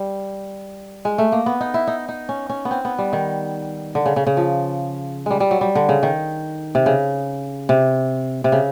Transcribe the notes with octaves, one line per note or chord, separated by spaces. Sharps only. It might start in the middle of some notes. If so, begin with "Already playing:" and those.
Already playing: G3
G#3
A3
A#3
B3
D#4
E4
D#4
D#4
C#4
C#4
B3
C4
B3
G3
D#3
D3
C#3
C#3
C#3
F3
G3 G#3
G3
F#3
G3
D3
C#3
D#3
C3
C#3
C3
C3
C#3